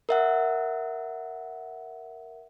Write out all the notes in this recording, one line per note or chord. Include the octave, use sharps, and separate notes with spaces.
A#4 E5 F#5